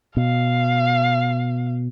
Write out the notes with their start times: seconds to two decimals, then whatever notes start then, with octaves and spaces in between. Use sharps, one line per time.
0.17 B2 F5